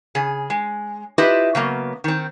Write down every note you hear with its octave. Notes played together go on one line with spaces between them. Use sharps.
C#3 G#4
G#3
E4 F4 G4 B4 D#5 E5
C#3 F#3 A#3 B3
D#3 C4